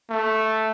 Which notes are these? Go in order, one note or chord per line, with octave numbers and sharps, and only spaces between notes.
A3